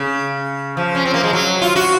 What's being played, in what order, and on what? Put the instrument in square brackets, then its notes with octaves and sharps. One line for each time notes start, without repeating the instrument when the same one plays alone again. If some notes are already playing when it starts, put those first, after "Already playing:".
Already playing: [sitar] C#3
F3
C#4
C4
A#3
G#3
F#3
F4
F#4